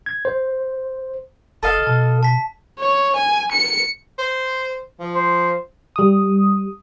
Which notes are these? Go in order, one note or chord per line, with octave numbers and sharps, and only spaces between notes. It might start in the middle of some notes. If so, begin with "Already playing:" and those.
G#6
C5
F#1 A4 D#5 F5
B2 A5
A5 B6
C#5
G#5
C#7
C5
F3
C5
G3 D#6